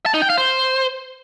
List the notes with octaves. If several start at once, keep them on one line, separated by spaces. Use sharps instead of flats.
A5
D#4
G5
F5
C5